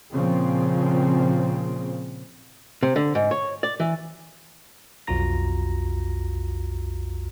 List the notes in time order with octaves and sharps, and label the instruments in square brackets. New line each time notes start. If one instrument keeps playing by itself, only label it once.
[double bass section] A#2 C#3 F3 C4
[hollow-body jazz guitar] C3
D3
G#2
C#5
D5
E3
[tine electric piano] B1 F2 F4 F#4 A#5 A#6